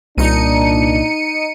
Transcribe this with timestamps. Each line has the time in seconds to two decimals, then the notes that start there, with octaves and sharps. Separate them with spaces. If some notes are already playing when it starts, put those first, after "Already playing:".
0.18 C2 A#2 D4 D#4 C#7 D#7